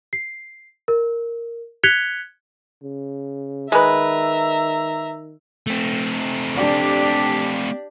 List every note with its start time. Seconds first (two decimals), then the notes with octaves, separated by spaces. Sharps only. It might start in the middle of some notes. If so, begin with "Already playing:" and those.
0.13 C7
0.88 A#4
1.83 F#6 G#6 B6 C#7 F7 G7
2.83 C#3
3.72 D#3 G#3 B4 E5 A#5
5.67 A3 C4
6.55 D4 G4 D5